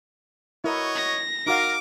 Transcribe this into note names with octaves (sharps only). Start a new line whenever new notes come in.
E4 F#4 A#4 C#5 D#5
A#6
D#4 F#4 A#4 F5 D6